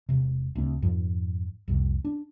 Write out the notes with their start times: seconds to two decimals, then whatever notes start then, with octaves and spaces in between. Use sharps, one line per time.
0.09 E1 C3
0.55 D2 C#3 A3 C4
0.82 F2 G#2 F3
1.68 C2 F2 C3
2.05 D4